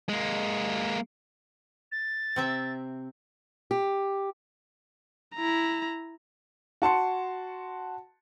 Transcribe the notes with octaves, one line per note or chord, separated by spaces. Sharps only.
G#3 A#3
A6
C3 C4 E5
G4
E4 A#5
F#4 A5 C6 C#7